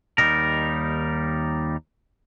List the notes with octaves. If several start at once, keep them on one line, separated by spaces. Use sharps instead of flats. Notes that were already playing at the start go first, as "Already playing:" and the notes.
D#2 G3 D#4 A#4